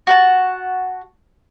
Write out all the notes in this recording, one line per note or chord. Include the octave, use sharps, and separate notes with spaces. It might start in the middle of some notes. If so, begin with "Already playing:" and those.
F#4 F#5 A5